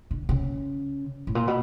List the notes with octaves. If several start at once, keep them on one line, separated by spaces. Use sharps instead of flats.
D3
C#3
A2
A#2
B2